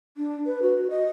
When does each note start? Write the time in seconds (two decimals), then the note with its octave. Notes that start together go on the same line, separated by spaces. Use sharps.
0.17 D4
0.46 B4
0.62 F#4
0.90 D#5